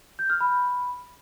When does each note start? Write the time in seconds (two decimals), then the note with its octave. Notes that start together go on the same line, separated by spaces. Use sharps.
0.19 G6
0.30 F6
0.40 B5